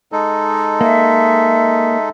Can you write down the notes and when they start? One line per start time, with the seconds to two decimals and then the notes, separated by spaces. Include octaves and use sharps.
0.12 G#3 D#4 A4
0.81 A#3 E5